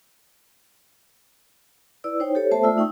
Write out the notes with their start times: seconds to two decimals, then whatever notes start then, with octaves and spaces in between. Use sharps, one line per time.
2.04 E4 B4 D5 E6
2.20 D#4 C5 C#5 G5
2.35 G4 A4 C5 C#5
2.51 A3 B3 A4 C5 E5 A5
2.63 A3 F4 D5 E5 E6
2.78 D#4 G5 C#6 E6